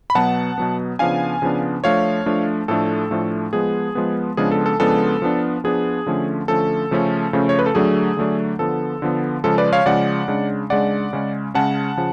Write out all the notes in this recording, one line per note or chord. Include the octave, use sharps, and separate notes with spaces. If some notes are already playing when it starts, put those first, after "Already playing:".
B5
B2 F#3 B3 F#5 A5
B2 F#3 B3
C#3 F3 B3 D4 F5 G#5
C#3 F3 B3 D4
F3 A3 D4 C#5 F5
F3 A3 D4
A2 F3 A3 D4 A4
A2 F3 A3 D4
F3 G#3 B3 G#4
F3 G#3 B3
C#3 F3 G#3 B3 D4 G#4
A4
A4
C#3 F3 G#3 B3 D4 A4
F3 B3 D4
F3 B3 D4 G#4
D3 F3 A3 C#4
D3 F3 A3 C#4 A4
C#3 F3 A3 C#4
C#3 F3 A3 C#4
C#5
B4
A4
D3 F#3 A3 D4 G#4
D3 F#3 A3 D4
D3 F3 B3 A4
D3 F3 B3
C#3 F3 G#3 A4
B4 D5
C#5 F5
C#3 F3 G#3 D5 F#5
C#3 G#3 D4
C#3 G#3 D4 D5 F#5
C#3 G#3 C#4
C#3 G#3 C#4 F#5 A5
C#3 F3